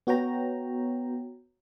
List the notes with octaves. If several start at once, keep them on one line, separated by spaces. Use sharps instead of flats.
B3 F#4 C#5 G5 A#5